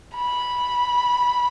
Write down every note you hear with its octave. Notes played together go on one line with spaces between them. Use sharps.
B5